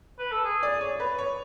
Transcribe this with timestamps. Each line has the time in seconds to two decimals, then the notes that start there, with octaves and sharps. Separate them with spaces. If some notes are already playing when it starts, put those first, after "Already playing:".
0.19 B4
0.31 A4
0.44 G#4
0.63 D5
0.81 C#5
1.00 B4
1.18 C#5